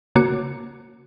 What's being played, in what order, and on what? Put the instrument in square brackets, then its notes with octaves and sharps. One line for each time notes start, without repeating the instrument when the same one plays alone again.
[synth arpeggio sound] C#3 A#3 F#4 D6 C#7